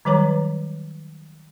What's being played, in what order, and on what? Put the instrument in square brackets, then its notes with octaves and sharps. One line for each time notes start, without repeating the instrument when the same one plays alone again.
[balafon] D#3 F#3 G3 B4 C#5 A#5